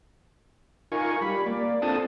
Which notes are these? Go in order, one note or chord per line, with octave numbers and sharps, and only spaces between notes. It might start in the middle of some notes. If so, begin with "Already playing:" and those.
D#4 F4 A#4 G#5 C#6
G3 B5
A#3 D5
C4 D4 F4 A4 A5 D#6